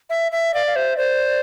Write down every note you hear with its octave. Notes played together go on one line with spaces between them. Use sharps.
E5
E5
D5 F5
F5
C5 E5
C5 D5